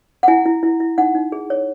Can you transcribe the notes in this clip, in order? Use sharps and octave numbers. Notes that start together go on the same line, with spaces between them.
F#5
E4 G#5
E4
E4
E4
D#4 F#5
D#4
G#4
C#5